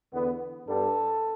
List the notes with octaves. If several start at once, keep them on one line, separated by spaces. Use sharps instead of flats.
E2 D3 B3
G2 G3 B3 A4